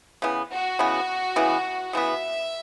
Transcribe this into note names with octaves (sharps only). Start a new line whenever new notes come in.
C#3 E3 B3
F#4
C#3 E3 B3
C#3 E3 B3
C#3 E3 B3 E5